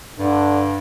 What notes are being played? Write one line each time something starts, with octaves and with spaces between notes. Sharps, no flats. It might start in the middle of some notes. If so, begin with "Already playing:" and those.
G2 D3